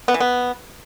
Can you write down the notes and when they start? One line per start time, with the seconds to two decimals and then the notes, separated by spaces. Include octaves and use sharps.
0.08 B3
0.14 E3
0.20 B3